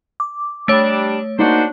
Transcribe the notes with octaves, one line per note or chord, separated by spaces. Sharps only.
D6
G3 A3 D4 C#5 D7
A#3 D4 D#4 F#4 C5